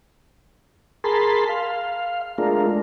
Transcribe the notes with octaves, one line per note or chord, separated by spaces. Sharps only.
G#4 A#4 A5 B5 C6
F5
G#3 A3 D4 F4 A#4